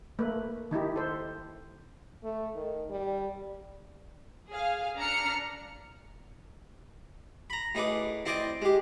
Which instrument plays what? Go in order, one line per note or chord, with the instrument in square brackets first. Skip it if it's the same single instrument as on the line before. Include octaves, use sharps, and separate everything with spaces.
[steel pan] A3 A#3 B4
D#3 D#4 E4 G4
A4 C5
[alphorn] A3
D#3
G3
[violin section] G#4 F5
D4 A#5 F6 C#7
[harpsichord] A#5 B5
A2 D#4 G#4 B4 D6
C4 E4 C5 D5 D#5 G5
G#3 G4